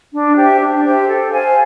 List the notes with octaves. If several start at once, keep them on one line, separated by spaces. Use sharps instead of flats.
D4
G4 C5 E5
D4
G4 C5 E5
A4
C5 F5 G#5